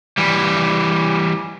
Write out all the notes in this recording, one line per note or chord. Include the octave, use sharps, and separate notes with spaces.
E3 G3